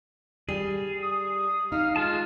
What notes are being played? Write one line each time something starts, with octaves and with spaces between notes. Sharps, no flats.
G3 G#4
D#6
D#4 F5
G#3 F4 G#4 A5